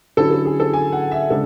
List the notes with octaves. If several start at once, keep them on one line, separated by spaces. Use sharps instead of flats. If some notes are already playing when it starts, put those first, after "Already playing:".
D3 F#3 C#4 E4 A4
A4
G#4
A4
G#5
F#5
E5
C#3 G#3 D4 A4